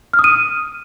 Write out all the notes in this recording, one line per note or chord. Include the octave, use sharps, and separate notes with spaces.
F6
D#6
D#7